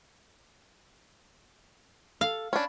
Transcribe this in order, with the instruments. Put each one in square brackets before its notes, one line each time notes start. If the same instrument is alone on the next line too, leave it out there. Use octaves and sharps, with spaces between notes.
[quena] A4 [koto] F5
[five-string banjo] C#4 D4 [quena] B5